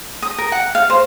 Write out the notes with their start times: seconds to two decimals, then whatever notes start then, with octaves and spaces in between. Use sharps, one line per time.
0.22 D#6
0.38 A#4
0.52 F#5
0.75 F5
0.90 C5